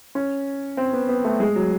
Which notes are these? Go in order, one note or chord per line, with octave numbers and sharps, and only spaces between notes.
C#4
C4
B3
B3
A3
G#3
F#3